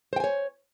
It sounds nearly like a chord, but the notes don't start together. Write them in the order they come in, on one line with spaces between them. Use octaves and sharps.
C5 G5 G#5 C#5